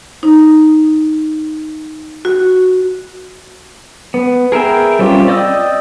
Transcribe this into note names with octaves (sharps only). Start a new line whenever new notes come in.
D#4
F#4
B3
G#4 A#4 B4 E5 G5
G3 C4 C#4 F4 G4
D5 D#5 G5 D#6 E6